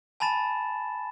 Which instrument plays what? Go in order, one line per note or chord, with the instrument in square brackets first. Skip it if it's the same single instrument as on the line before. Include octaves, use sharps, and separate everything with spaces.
[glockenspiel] G#5 A5 B5 A6 E7